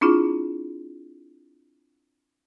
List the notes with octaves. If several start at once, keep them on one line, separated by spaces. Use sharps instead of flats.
C4 D4 E4 F4 G#4